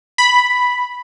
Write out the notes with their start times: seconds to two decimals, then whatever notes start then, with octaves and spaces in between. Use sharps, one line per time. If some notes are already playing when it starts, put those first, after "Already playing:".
0.18 B5